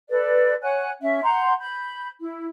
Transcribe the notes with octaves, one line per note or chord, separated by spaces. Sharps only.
A4 B4 D5
C#5 F#5 G#5 F#6
C#4 E5
F#5 A#5 C6 G6
B5 G6
E4